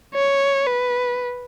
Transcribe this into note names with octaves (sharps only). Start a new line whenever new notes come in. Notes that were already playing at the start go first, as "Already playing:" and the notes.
C#5
B4